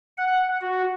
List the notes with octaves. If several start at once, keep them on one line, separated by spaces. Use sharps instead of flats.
F#5
F#4